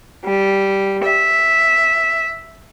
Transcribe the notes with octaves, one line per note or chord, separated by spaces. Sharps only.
G3
E5